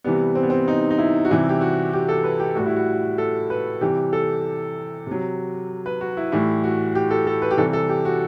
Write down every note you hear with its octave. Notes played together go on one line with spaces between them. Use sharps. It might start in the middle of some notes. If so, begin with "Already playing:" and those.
C3 E3 G3 B3
C4
B3
C4
D#4
D#4
E4
F#4
C3 E3 G3 E4
G4
F#4
G4
A4
B4
G4
A2 G3 F#4
E4
F#4
A4
B4
C3 E3 G3 G4
A4
C3
F#3
B4
F#4
E4
A2 E3 G3 E4
F#4
G4
A4
A4
B4
G4
C3 E3 G3 A4
A4
G4
F#4